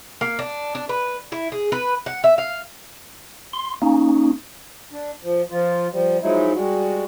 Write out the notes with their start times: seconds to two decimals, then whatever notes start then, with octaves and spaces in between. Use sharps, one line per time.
0.21 A#3
0.39 D4
0.75 D4
0.89 B4
1.32 E4
1.52 G#4
1.72 B4
2.06 F#5
2.24 E5
2.38 F5
3.53 C6
3.82 A#3 C#4 D#4
4.91 D4
5.23 F3
5.51 F3 F4
5.91 F3 G3
6.22 F3 F#3 G#3 D#4 E4
6.55 G3 G#3 F#4